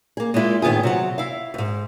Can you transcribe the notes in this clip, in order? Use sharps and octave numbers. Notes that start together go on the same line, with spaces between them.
A#3 G#4
G#3 A#3 D4 E4 F4
A2 D#3 B3 F4 G#4
C3 F#3 F#5
E4 F5
F2 G#2